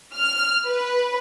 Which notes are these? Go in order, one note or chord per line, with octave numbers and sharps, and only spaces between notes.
F6
B4